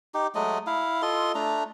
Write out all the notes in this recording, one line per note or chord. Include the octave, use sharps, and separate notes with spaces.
D#4 G4
F#3 G#3 A3 D#5
E4 F5
F4 A4 D#5 C6
A3 D4 A#5